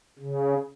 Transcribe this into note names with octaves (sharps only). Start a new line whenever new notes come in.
C#3